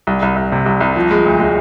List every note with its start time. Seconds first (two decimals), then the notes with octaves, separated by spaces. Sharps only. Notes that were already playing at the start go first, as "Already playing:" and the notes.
0.07 C2
0.22 C2
0.36 C2
0.52 C3
0.66 C2
0.80 C2
0.96 F3
1.11 G#3
1.26 D2
1.40 G#3